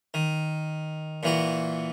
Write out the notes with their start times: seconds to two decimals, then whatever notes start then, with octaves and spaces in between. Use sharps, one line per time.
0.14 D#3
1.23 A#2 E3 F#4